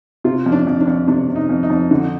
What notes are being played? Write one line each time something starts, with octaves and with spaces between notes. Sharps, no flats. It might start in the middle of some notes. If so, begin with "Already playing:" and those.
C3 F4
F2
D4
F2
D4
F2
C3 D4
C3
D#4
F2
D#4
F2
D3